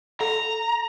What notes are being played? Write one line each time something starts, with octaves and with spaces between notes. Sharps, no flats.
A4 A#5